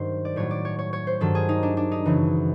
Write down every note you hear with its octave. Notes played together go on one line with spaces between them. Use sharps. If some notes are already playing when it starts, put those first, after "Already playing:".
Already playing: G2 D#3 F#3 C5
D5
A2 F#3 C#5
D5
C#5
C#5
C#5
C5
G2 D#3 F#3 A4
G#4
D#4
D4
D4
D#4
F#2 C#3 E3